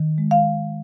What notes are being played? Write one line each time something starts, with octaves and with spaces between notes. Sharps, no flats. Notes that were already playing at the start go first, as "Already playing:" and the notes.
Already playing: D#3
G#3
F5